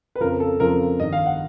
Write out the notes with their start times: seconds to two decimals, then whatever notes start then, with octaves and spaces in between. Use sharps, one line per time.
0.15 B4
0.20 F2 C#3 F3 A#4
0.40 A4
0.60 F2 C#3 F3 A#4
1.00 G2 D#3 D#5
1.13 F5
1.26 F#5